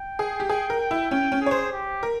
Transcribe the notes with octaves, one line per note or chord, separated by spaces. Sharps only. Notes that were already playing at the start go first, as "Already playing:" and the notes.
Already playing: G5
G#4
G4
G#4 G5
A#4
G5
E4
C#4 G5
C#4
G#4
C#5
C5
G4
A#4